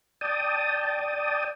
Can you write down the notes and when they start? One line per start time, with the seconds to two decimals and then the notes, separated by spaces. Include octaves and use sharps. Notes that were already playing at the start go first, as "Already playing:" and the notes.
0.21 D5 G5 A5 D#6